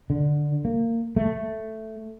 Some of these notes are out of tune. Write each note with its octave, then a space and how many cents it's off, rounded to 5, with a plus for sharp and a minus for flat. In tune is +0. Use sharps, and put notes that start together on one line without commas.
D3 +5
A#3 -20
A3 +0